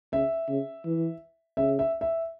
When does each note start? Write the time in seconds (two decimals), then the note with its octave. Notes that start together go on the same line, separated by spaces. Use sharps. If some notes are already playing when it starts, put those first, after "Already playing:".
0.13 C#3 E5
0.48 C#3
0.85 E3
1.57 C#3 E5
1.79 E5
2.01 E5